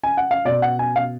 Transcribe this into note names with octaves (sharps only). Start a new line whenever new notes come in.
G#5
F#5
F5
B2 D5
F#5
G#5
F5